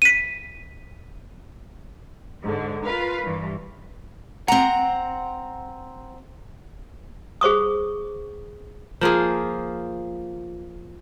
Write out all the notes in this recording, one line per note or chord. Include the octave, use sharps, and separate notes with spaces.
B6 D#7
G#2 D3
F4 A#4 B4 F5
G2 E3
C4 F#5 A#5
G#4 C5 C#6 D#6
F3 A#3 F4 G#4